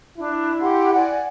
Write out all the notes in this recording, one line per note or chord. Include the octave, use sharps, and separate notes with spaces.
D4 E4
G4 F#5 C6
D5 F#5 G#5